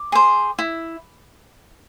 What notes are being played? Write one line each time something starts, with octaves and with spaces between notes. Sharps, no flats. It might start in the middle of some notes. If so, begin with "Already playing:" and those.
Already playing: D6
G#4 C5
E4